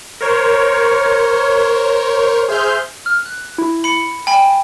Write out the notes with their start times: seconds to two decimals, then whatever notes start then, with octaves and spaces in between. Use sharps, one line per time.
0.21 A#4 C5 C#5
2.49 G#4 C5 E5 F6 G6
3.06 F6
3.25 F#6
3.58 E4
3.84 B5 C#7
4.27 G5 G#5 B5